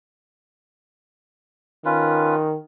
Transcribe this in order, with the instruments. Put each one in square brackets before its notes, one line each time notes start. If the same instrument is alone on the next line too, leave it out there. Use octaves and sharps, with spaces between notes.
[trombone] D#3 [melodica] C#4 F4 B4